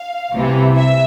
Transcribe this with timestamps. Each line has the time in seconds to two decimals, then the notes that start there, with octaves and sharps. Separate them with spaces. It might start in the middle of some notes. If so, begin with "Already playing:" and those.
Already playing: F5
0.33 C2 C3 E3
0.76 E5